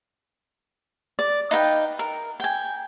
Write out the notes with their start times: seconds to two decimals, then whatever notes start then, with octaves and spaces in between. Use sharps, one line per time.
1.19 D5
1.51 D#4 B4 F5 G5
1.99 A#4
2.40 G5 G#5